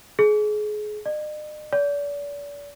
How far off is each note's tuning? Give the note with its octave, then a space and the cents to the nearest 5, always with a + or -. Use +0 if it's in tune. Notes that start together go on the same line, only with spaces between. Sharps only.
G#4 +30
D#5 -45
D5 -40